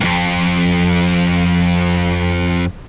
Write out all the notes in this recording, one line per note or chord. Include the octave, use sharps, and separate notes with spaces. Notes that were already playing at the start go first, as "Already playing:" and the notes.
C2 F2